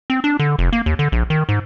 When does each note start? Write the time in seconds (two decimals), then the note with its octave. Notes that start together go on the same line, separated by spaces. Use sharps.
0.10 C4
0.24 D4
0.39 D3
0.59 F1
0.73 A#3
0.86 D#2
0.99 D3
1.12 A#1
1.30 D#3
1.49 G#2